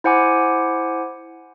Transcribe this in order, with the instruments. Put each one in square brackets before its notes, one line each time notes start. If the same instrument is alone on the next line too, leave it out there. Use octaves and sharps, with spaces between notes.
[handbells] E4 C5 F#5 G#5 D6